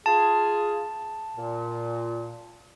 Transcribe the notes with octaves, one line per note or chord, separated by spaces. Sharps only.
F4 G#4 A5
A#2